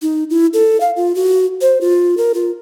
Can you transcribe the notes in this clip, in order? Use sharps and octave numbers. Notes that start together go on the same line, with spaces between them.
D#4
E4
A4
F5
F4
F#4
C5
F4
A#4
F4